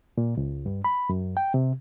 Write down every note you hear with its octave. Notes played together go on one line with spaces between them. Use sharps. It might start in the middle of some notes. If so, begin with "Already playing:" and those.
A#2
C#2
G2
B5
F#2
G5
C3